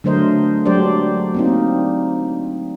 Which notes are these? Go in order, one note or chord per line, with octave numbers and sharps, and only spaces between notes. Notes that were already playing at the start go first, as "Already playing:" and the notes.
D3 F#3 A3 A#4 C5 D#5
F#3 G#3 D4 G4 C5 D5
A#3 C4 D#4